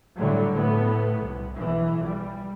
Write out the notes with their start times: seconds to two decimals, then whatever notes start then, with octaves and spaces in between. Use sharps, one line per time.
0.18 A2 D3 F#3 G3
0.54 A2 B3
1.19 C2
1.54 B1 E3
2.03 G3